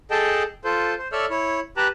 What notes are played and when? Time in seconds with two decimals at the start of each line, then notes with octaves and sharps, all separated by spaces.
0.11 G#4 A4 D#5 G5 A5
0.64 F4 A4 C5
0.99 C5
1.12 A4 C#5 D5 E5 E6 F6
1.30 E4 C#5
1.77 G4 B4 A5 A#5 F#6